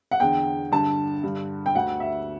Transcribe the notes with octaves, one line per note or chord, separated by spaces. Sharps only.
F#5
E2 D3 G5
G2 D3 A5
G2 D3
G5
D2 D3 F#5
E5